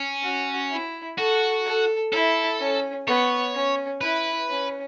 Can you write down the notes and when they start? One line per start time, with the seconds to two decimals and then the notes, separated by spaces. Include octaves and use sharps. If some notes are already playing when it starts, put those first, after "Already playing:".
Already playing: C#4
0.23 F#4
0.71 E4
1.18 F#4 A4
1.65 A4
2.12 E4 A4
2.59 C#4
3.07 B3 C#5
3.54 C#4
4.01 E4 B4
4.49 C#4